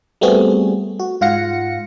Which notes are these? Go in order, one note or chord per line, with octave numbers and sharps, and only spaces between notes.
G3 A3 B3 C4 F#4 G#4
F#4
G#2 F4 F5 F#5 A#6 C#7